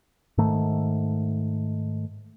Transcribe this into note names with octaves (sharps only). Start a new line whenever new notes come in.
G#2 D#3 A3